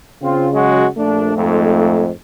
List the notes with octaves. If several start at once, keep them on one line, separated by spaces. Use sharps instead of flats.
C#3 C4 F4
F#3 G#3 F#4
A#1 A3 D4
F2 G#2